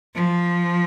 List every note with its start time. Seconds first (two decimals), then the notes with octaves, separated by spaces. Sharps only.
0.15 F3